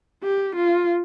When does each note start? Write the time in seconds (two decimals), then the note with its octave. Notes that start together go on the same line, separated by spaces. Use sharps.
0.24 G4
0.55 F4